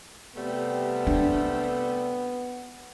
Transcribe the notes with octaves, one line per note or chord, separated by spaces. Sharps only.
C3 G3 A3 B3
D4